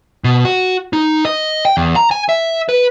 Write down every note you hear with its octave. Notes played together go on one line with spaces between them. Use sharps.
B2
F#4
D#4
D#5
G5
E2
A#5
G#5
E5
B4